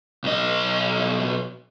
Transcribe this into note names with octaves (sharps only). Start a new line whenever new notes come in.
B1 D#5